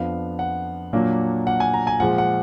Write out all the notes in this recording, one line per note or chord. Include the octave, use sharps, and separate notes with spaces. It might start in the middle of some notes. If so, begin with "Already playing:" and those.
Already playing: F2 F3 B3 D4 F5
F#5
A#2 F#3 A#3 D4
F#5
G#5
A#5
G#5
A#2 F3 G#3 F#5
F#5